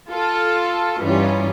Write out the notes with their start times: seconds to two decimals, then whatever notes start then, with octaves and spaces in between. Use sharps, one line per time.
0.10 F4 A4
1.01 G2 E3 G3 C#4 D#4 F4